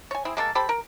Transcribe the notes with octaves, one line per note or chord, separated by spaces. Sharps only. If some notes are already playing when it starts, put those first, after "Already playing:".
C#5 G#5
C4 E4 G#4
G#3 A#3 A4 A#4
G4 A4 C5 B5
A#4